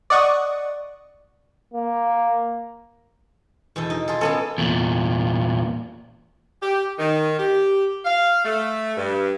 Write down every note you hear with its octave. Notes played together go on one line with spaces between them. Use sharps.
D5 D#5 F#5 C#6 D#6
A#3
E2 B2 A4
D#4
F4 G#4 A4
A#3 B3 C#4 A4
E2 A#2
G4
D#3
G4
F5
A3
G2